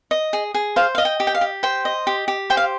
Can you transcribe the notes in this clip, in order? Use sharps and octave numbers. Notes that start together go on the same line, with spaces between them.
D#5
G#4
G#4
C5 F5
D#5 F5
G5
G4
G5
F5
G4
C5 G5
D#5
G4
G4
C5 G5
F5